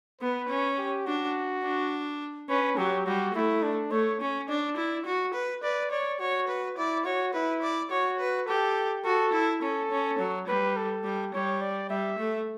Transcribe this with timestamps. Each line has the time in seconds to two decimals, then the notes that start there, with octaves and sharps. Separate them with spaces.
0.21 B3 B4
0.49 C#4
0.78 G4
1.06 D4 F#4
1.64 D4
2.49 C#4 B4
2.77 F#3 G4
3.06 G3 F#4
3.34 A3 E4
3.63 D4
3.91 A3 C#5
4.21 C#4
4.49 D4 D5
4.77 E4
5.05 F#4
5.34 B4
5.63 B4 D5
5.91 C#5 D5
6.20 F#4 C#5
6.48 B4
6.77 E4 D5
7.05 F#4 C#5
7.33 E4 B4
7.62 D5
7.91 F#4 C#5
8.19 B4
8.48 G4 A4
9.04 F#4 A4
9.33 E4
9.61 C#4 A4
9.91 C#4
10.19 F#3
10.47 G3 B4
10.77 A4
11.04 G3
11.34 G3 C#5
11.61 D5
11.90 G3 E5
12.19 A3